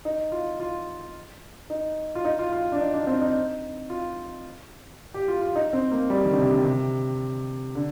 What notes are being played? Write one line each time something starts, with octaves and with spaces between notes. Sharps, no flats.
D#4
F4
F4
D#4
F4
D#4
F4
F4
D4
D#4
D4
C4
D#4
F4
G4
F4
F4
D#4
C4
A#3
G3
D#3
D3
C3
D3
C3
D3